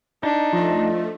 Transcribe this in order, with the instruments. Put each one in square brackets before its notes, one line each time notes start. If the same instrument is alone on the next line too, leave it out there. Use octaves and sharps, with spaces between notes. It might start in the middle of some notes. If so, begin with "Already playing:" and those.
[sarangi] D4 [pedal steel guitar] D#4
[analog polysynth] F3 A3 [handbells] F4 D5 D#5